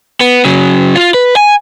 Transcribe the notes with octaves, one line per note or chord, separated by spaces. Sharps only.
B3
C#3 F#3
F4
B4
G#5